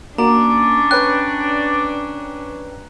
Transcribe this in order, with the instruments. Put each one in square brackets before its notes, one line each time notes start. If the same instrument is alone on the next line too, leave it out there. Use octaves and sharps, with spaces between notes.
[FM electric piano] A#3 F#4 [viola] C#4 D4 [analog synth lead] D5 [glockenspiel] A#5
[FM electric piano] B4 C#5 G5 [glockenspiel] F#6